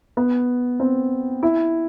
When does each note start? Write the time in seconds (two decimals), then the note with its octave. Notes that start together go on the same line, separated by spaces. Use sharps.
0.17 B3
0.80 C4
1.43 E4